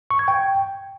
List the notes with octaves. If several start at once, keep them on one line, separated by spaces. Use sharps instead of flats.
C#6
G#6
G5